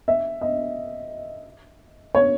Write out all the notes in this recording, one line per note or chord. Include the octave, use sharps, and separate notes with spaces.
E5
D#5
C#5